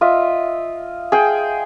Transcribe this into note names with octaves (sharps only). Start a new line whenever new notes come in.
F4 D#5 E5
G#4 G5